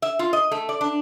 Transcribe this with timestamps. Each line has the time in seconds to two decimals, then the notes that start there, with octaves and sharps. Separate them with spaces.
0.02 E5
0.19 F4
0.33 D#5
0.51 A3
0.69 D5
0.81 D4